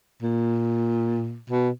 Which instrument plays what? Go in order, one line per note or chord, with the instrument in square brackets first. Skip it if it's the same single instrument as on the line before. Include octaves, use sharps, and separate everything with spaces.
[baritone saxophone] A#2
B2